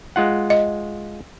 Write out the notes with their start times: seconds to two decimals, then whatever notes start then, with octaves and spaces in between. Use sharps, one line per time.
0.16 G#3 F4 F#5
0.50 D#5